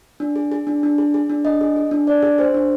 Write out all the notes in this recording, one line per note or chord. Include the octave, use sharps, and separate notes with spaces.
D4
G#4
G#4
D4
D4
G#4
G#4
D4
D4 D#5
G#4
G#4
D4
D4 D5
G#4
G#4 C5
D4